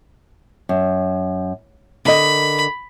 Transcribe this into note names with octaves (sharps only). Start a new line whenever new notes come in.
F#2
D3 A#4 D#5 B5